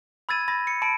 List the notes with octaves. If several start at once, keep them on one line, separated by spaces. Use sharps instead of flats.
B5 E6 G#6 A6 D#7
B5 A6 A#6
C#7
A5 B5 C#7 D7